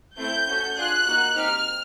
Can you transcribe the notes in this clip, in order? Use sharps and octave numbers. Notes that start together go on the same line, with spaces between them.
A3 C4 E4 G6
C#4 F#4 A4
D4 F4 G#4 F#6
A#3 D#4 F#4
C4 D#4 G4 F6